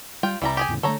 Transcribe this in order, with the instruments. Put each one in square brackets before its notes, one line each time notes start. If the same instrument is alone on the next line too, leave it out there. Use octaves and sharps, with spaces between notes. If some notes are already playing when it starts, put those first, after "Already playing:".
[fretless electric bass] G3 [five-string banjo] F4 G5
[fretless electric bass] C2 [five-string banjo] E3 G3 A#5
[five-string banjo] G4 G#4 G#5
[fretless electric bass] E2 A2 C#3
[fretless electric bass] D3 F#3 A3 [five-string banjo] A4 C#5 A#5